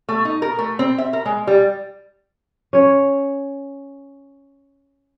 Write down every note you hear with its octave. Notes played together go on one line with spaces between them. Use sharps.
A3
D#4
A#4
A3
C4
E5
A#4
G#3
G3
C#4 C#5